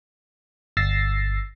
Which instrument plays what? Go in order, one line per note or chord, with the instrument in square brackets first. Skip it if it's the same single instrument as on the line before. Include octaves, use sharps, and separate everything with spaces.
[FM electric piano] G1 E6 A6 A#6 C7